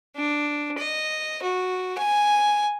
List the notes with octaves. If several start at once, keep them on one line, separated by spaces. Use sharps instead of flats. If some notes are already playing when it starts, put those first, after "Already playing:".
D4
D#5
F#4
G#5